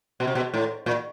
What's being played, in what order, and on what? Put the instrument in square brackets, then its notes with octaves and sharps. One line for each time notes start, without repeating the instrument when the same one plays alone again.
[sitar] B2
C3
B2
A2
A#2